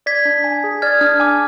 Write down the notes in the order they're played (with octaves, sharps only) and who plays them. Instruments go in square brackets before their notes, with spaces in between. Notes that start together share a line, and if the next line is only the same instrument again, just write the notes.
[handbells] D5 [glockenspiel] G#6 B6
[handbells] D4
G#5
G#4
[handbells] D5 [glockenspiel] F6 G#6
[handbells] D4 [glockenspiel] F6
[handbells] G#5 [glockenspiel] D6